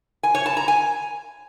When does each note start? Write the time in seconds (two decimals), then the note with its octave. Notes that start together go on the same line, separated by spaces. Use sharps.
0.23 G#5
0.35 C#5
0.46 A5
0.57 A#5
0.68 G#5